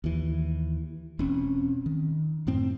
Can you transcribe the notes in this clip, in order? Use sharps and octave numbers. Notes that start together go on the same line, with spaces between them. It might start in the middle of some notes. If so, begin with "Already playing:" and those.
D#2 E3
E1 C4 C#4
D#3
F#2 A2 C4